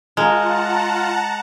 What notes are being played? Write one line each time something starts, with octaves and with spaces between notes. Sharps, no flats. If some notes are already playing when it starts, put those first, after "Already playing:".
G#3 F4 A#4 F#5 A5 A#5